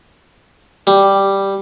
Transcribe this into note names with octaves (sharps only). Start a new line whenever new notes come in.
G3